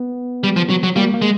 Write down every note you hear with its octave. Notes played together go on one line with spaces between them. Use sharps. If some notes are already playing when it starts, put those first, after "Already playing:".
Already playing: B3
G3
F3
F#3
F#3
G3 A#3
A#3
G#3